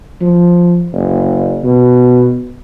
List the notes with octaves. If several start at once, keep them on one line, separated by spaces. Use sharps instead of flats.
F3
F#1
B2